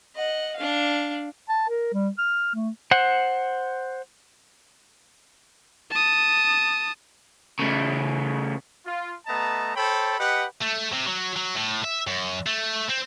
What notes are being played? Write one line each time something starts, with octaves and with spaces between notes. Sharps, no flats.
D#5 F#5
D4 F5
A5
A#4
G3
F6
A3
C5 F#5
A5 D#6
C#3 A3
F4
A3 B3 D#5 A5 A#5
A4 C5 C#5 G5 A5 B5
G4 B4 D#5 F#5
A3
C3
F#3
F#3
A2
E5
F#2
A3
C4